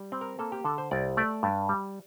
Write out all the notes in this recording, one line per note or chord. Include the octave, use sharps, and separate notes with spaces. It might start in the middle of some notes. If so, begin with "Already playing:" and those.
Already playing: G3
C4
A#4
A#3 A4
G4
D3 A4
C5
C2 D5
A3 D5
G2
G3